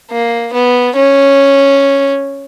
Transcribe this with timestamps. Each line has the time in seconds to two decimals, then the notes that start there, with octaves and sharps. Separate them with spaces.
0.11 A#3
0.53 B3
0.96 C#4